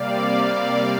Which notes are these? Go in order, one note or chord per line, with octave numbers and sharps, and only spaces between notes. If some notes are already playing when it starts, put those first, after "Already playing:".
Already playing: C3 G3 A#3 D5 F5